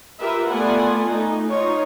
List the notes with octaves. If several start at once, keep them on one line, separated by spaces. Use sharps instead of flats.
F4 G4 A#4 B4 E5
A3 B3 F4 D5 F#5 G#5
A3 D#4
D#4 F4 C#5